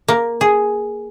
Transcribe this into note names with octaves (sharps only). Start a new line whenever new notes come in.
A#3
G#4